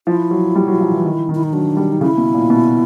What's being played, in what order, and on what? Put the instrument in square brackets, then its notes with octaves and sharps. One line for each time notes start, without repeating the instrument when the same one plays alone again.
[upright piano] F3 [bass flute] E4
[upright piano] F#3
G3
F#3
F3
E3
D#3
D#3
[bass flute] E4
D#4
[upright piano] F#3 [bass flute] D4
[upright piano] G3
[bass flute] D#4
[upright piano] C#3 [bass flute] E4
[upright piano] B2
A#2
B2